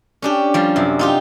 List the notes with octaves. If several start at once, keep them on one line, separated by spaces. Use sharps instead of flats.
C#4 D4 G4
F3 G3
F#2 C3
D#4 F4 G4